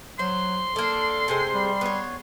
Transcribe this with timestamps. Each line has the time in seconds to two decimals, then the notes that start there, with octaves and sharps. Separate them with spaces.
0.19 F#3 C5 C6
0.76 A#3 D4 A4
1.28 C3 G#3 C5
1.54 G3
1.81 B3 C#5